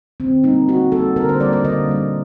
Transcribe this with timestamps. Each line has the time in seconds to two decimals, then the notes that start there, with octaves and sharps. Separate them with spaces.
0.20 D3 C4
0.44 G3 A#3 D#4
0.68 D3 F#4
0.92 G3 A#3 A4
1.16 D3 A#4
1.29 C5
1.40 G3 A#3 D5
1.53 D5
1.65 D3 D#5
1.89 G3 A#3